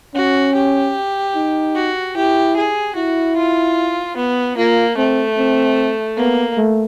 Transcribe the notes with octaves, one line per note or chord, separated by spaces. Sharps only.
C#4 F#4
G4
D#4
F#4
E4 G4
G#4
E4 F#4
F4
B3
A#3 F4
A3 C4
C4
A#3 B3
A3